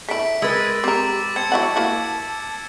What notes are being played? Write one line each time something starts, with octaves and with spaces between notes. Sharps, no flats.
A3 E4 E5 B6 D7
G#3 A#4 B4 E6 A6
C4 G4 A#4 D6
C4 A5 G#6 C#7
F#3 E4 F#5
A#3 E4 F#4